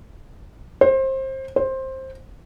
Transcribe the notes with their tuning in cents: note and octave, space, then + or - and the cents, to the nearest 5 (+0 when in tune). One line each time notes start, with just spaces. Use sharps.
C5 +25
C5 +15